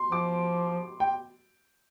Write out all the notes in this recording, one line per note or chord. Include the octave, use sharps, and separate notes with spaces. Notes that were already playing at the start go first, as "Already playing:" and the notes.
Already playing: C6
F3 D6
G5